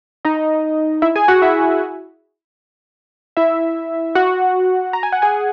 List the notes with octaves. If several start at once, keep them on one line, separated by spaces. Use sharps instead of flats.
D#4 D#5
E4 E5
G#4 G#5
F#4 F#5
E4 E5
E4 E5
F#4 F#5
A#5
G#5
F#5
G#4 G#5